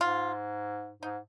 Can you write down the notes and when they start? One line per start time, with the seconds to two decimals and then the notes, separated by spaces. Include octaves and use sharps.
0.01 G#2 F4
1.02 G#2 D#4